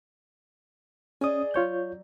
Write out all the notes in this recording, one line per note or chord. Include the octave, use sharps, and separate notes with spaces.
C#4 G#4 D5 D#5 D#6
F#3 F4 C#5 G6